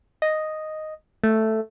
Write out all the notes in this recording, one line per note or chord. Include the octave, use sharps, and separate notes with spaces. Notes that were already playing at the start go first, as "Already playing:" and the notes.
D#5
A3